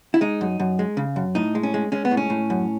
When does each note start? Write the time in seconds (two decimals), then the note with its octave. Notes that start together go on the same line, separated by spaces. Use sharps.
0.14 E4
0.21 G#3 D#4
0.41 F#2
0.60 F#2
0.79 G#3
0.97 C#3
1.16 F#2
1.35 A2 D#4
1.55 G#3
1.63 C#4
1.74 G#3
1.92 G#3 C#4
2.05 B3
2.11 A2
2.17 C#4
2.30 A2
2.50 F#2